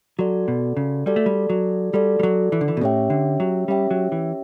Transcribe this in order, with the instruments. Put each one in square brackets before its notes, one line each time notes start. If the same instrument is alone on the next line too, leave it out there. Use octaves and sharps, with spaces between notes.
[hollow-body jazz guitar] F#3 [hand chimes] F#4 A4 D5
[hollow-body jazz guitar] B2
C#3
[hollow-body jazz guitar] G3 [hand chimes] F#4 A4 D5
[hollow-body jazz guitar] A3
G3
F#3
[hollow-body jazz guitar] G3 [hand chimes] F#4 A4 D5
[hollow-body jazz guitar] G3
F#3
E3
D3
E3
B2
[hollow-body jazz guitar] A2 [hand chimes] C#4 G4 C#5 E5 G5
[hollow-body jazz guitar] D3
F#3
[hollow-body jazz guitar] G3 [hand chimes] C#4 G4 C#5 E5 G5
[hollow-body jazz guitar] F#3
E3